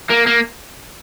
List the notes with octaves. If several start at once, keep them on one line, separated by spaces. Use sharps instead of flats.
A#3
A#3